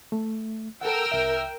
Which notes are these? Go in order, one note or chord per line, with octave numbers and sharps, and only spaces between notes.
A3
A4 A#4 F#5 G5 E6
C2 E5